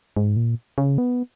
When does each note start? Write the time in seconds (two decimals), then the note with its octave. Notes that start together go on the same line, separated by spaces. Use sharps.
0.17 G#2
0.36 A#2
0.78 C#3
0.98 B3